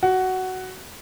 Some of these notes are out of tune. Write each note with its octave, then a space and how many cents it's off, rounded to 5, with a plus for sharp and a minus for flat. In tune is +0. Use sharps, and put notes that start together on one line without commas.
F#4 +10